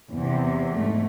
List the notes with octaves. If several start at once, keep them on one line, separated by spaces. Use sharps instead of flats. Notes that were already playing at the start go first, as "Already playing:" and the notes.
E2 C3
G#2 A3